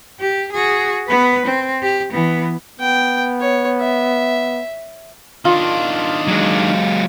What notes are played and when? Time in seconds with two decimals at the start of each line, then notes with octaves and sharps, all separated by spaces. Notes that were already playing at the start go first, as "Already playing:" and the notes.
0.20 G4
0.52 F#4 G#4
1.07 B3 B4
1.46 C4
1.83 G4
2.13 E3 B3
2.80 B3 G5
3.40 C#5
3.80 E5
5.45 D#3 D4 F4
6.28 F#3 G#3